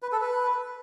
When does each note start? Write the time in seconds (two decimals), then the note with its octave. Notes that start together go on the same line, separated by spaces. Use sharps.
0.02 B4
0.12 A4
0.21 B4